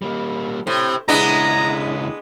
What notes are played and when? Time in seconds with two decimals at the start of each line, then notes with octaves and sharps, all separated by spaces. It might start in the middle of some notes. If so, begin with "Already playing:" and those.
0.02 G3 A#3
0.67 A2 G4 C5
1.08 C#2 G#3 B3 D4 E4 A#5